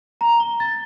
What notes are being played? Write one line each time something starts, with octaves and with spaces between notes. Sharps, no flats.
A#5
G7
A6